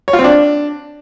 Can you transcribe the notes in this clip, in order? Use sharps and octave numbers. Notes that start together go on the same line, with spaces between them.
C#5
F4
C4
D4